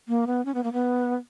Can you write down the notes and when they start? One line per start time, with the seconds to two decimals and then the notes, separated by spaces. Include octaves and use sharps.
0.08 A#3
0.27 B3
0.45 C#4
0.54 B3
0.64 A#3
0.73 B3